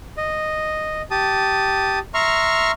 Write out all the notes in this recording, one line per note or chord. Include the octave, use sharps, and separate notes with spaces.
D#5
G4 A5 D#6
E5 A#5 C6 C#6 F6